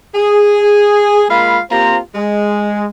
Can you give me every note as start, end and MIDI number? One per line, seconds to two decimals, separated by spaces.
0.15 1.24 68
1.30 1.59 56
1.30 1.59 58
1.30 1.59 65
1.30 1.59 77
1.30 1.59 83
1.70 1.98 58
1.70 1.98 60
1.70 1.98 65
1.70 1.98 67
1.70 1.98 72
1.70 1.98 82
2.15 2.88 56